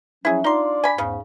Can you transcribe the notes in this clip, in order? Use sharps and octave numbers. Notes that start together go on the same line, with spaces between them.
F3 F#3 C#4 E4 G#4
D4 D#4 F4 D5 C6
G#5 B5
E2 G#2 C#3